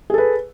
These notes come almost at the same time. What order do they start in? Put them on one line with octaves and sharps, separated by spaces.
G#4 A4 B4